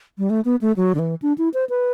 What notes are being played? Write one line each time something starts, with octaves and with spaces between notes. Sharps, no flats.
G3
A3
B3
A3
F#3
D3
E3
D4
E4
C5
B4